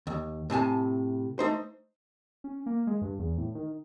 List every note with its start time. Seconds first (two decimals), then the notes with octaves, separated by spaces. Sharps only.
0.07 D#2
0.50 A2 C3 G#5 A5
1.39 A3 D#4 C5
2.44 C#4
2.66 A#3
2.87 G#3
3.02 G2
3.19 E2
3.38 A2
3.55 D#3